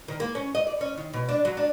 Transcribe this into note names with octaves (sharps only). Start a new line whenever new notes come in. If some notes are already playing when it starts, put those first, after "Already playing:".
D#3
A#3
C#4
D#5
D5
C#4
D#3
B2
D4
F#3
D4